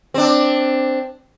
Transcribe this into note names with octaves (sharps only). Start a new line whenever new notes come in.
C4 D4